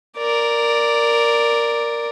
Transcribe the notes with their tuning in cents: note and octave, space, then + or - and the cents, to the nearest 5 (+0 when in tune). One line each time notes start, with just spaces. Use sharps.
A#4 +0 D5 +0